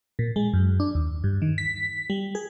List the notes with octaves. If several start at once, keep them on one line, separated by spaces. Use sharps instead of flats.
A#2
G#3
F#2
D4
D#2
G2
D#3
B6
G3
G#4